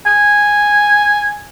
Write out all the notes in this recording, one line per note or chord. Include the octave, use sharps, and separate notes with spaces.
G#5